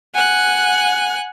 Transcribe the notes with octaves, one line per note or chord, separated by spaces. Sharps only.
F#5 G#5 F#6